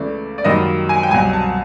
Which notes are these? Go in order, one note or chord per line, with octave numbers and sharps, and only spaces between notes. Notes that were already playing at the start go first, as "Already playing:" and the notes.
Already playing: C#2 C#3 E3 A3 D5
D5
F#2 D#3 G3 A#3 D#5
G#5
G5
C2 B2 F#3 G#5
A5